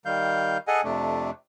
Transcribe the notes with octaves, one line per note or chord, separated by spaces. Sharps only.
D#3 G3 F5 G6
G#4 A4 D#5 F#5 G#5
F2 C3 A3 D4